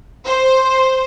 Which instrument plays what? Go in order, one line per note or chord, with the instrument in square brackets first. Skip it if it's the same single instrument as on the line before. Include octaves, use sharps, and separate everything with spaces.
[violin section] C5